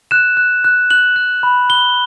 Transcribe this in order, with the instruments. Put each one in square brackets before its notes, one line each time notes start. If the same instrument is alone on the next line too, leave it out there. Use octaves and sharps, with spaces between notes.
[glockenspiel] F#6 E7
F#6
F#6
F#6 F#7
F#6
B5
F#6 G7